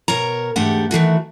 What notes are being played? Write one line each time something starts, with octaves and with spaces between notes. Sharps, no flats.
B2 A#4 C#5 A#5
E2 G#2 A3 D4 G4 F#5
D#3 E3 A3 F#4